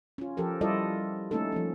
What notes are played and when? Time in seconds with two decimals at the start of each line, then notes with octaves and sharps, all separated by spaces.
0.18 C#4 F4
0.37 F3 G4 A4 A#4
0.61 G3 E4 F4 A4 D5 D#5
1.31 A3 A#3 C#4 D#4 A4
1.52 F3 A#3 C#4